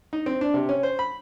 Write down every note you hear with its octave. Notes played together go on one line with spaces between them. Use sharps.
D#4
C4
D4
C3
C#4
C5
B5